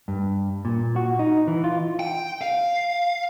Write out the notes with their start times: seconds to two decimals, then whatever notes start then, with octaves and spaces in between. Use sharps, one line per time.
0.08 G2
0.65 A#2
0.96 F#4
1.19 D#4
1.48 E3
1.64 F4
1.99 G5
2.41 F5